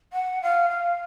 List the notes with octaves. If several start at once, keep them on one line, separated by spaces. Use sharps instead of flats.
F#5
F5
F5